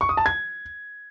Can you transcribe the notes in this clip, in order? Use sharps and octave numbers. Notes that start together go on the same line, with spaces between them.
C#6
D#6
A5
G#6